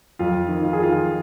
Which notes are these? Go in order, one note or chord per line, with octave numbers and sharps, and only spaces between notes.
F2 F4
D#3
F4
G#4
D#3 F4